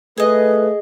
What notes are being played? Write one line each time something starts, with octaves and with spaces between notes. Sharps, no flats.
A3 G#4 B4 D#5